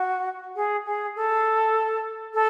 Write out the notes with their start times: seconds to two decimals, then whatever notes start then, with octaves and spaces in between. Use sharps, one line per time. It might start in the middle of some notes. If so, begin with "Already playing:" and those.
Already playing: F#4
0.56 G#4
0.86 G#4
1.16 A4
2.34 A4